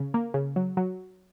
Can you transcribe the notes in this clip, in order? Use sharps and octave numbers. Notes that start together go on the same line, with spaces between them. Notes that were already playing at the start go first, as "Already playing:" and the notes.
Already playing: C#3
A#3
C#3
F#3
F#3